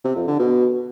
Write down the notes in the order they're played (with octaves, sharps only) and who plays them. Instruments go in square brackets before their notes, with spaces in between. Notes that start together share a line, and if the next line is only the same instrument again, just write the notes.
[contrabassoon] C3
F2
D3
B2